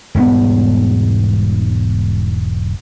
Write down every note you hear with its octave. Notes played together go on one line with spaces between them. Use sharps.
E1 G#2 G3 B3